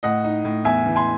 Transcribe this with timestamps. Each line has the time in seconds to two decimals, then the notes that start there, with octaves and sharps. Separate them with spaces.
0.03 A2 D#5 F#5
0.24 D#4
0.44 A2
0.64 E2 E5 G#5
0.86 E3
0.96 G#5 C6